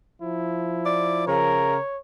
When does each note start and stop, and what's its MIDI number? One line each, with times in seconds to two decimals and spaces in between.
0.22 1.78 53
0.22 1.23 64
0.86 1.25 74
1.27 1.78 49
1.27 1.76 70
1.27 1.98 73